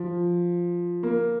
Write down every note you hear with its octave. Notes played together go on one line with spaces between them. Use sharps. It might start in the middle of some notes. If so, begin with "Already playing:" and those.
Already playing: F3
A#3